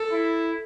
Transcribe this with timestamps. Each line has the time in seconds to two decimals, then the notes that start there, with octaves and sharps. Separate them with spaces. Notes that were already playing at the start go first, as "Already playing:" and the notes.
Already playing: A4
0.12 E4